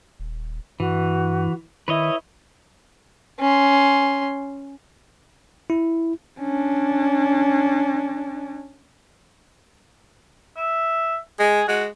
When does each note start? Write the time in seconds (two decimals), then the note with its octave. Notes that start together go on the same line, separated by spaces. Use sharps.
0.20 D#1
0.80 G2 E3 F#4
1.88 D#3 E4 B4 C#5 D#5
3.40 C#4 C6
5.70 E4
6.40 C#4 D4
10.57 E5
11.40 G#3 G#4
11.68 G#3 F#4